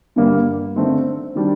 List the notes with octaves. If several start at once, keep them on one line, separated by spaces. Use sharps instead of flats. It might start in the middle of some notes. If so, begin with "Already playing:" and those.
G2 D3 G3 A#3
D3 A3 C4 D#4
D#3 G3 D4